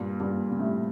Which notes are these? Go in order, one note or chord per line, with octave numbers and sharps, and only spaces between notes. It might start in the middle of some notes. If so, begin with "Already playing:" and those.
Already playing: G2 A#2
G2 A#2
A#2
A2 C3